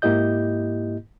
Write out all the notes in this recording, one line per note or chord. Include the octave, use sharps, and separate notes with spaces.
G#2 A#3 E4 G4 D#5 G6